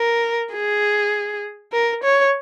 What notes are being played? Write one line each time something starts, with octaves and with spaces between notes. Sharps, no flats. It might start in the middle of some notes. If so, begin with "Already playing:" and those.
Already playing: A#4
G#4
A#4
C#5